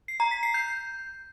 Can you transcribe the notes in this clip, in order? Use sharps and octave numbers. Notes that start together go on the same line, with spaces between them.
C7
A#5
B6
C7
G6